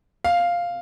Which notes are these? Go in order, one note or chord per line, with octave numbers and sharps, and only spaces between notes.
F5